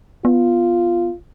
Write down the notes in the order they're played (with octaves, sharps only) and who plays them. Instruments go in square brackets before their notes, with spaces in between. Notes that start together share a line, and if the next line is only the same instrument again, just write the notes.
[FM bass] B3 [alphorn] F4